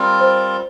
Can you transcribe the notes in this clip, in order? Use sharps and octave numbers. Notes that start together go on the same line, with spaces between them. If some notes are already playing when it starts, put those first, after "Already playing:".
Already playing: G3 C4 F4 A#4
C5